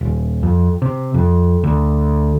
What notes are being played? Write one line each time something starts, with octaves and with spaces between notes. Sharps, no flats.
D#1
F2
C3
F2
D2